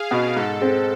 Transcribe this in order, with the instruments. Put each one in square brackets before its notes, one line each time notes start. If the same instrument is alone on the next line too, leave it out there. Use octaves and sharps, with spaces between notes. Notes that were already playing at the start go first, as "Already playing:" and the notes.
Already playing: [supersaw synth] G#4 F5
[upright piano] B2 B3
[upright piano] G#2 [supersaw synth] A4
[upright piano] G#3 C4